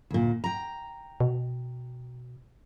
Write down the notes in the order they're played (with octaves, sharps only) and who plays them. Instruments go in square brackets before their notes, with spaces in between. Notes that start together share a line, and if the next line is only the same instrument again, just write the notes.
[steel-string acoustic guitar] D2 A#2
G5 A#5
[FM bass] B2